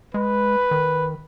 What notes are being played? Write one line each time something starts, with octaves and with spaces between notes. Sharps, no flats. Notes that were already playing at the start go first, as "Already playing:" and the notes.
G#3 B4
D#3